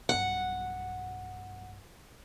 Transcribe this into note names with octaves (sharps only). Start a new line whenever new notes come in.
B1 G2 F#5